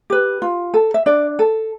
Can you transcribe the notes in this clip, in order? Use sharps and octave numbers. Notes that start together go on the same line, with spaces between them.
G4 B4
F4
A4
E5
D4 D5
A4